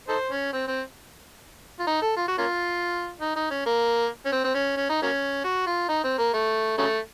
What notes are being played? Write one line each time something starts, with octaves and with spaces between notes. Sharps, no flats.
D#4 A4 C5
C#4
C4
C4
F4
D#4
A4
F4
F#4
A#3 C#4 F4
D#4
D#4
C#4
A#3
C#4
C4
C4
C#4
C#4
D#4
F#3 A#3 C#4
F#4
F4
D#4
C4
A#3
A3
C#3 F#3 A3